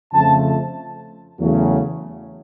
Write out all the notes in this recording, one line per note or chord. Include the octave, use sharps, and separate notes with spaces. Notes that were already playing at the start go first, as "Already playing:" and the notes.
F2 C#3 F3 A3 A5
E2 C#3 F#3 A3